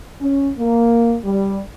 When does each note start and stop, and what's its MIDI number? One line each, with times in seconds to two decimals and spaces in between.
0.21 0.50 61
0.58 1.16 58
1.24 1.60 55